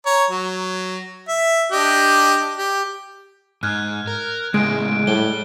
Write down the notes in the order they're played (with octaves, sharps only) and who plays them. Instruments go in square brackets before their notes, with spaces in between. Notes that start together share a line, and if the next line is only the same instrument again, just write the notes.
[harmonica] C#5 A#5
F#3
E5
D4 G4 D#5
G4
[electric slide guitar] G#2 [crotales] F6 F#6 G#6
[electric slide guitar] A#4
[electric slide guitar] A2 C#3 [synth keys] G#3 [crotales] D7
[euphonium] A2 [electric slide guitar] G3 [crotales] G7